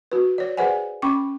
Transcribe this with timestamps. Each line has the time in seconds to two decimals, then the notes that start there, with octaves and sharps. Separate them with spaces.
0.12 F#4 B4
0.38 C#5 D5
0.57 G#4 B4 C5 D5 F#5 G#5
1.02 C#4 G5 B5 C#6 D6